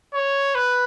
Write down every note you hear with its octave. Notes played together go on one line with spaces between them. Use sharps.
C#5
B4